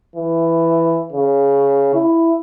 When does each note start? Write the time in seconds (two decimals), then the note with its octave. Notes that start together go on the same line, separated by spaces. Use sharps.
0.15 E3
1.12 C#3
1.94 E4